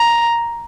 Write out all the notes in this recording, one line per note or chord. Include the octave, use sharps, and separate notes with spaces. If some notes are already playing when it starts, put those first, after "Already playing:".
Already playing: A#5